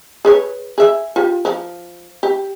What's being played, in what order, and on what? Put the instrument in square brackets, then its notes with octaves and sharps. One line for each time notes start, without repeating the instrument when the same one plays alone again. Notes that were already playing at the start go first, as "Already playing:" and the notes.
[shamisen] G#4 B4 C#5
G#4 E5
F4 G4
F3
G4